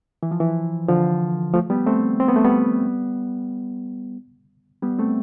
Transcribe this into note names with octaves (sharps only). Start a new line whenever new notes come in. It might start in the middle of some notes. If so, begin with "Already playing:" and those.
E3
F3
E3
D3 F3
F3 A3
G3 B3
A3 C4
C4
B3
A3
G3 B3
G3 B3
A3 C4